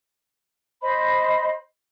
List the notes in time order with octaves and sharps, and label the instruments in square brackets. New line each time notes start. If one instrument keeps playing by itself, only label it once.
[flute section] C5 D#5 B5